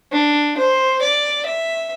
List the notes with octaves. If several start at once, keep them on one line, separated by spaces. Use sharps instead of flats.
D4
C5
D5
E5